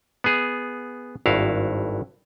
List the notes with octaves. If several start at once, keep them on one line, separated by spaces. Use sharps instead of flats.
B3 G#4
G#1 G2 E4 F#4 F5